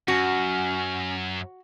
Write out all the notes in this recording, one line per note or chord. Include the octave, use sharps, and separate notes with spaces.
F#2 C#4 F#4